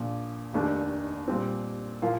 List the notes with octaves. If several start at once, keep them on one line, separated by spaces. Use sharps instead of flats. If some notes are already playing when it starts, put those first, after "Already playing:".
Already playing: A#1 A#2 F3
F1 D#2 D#3 A3 D4
A#2 G3 C4
A#2 F3 A#3 F4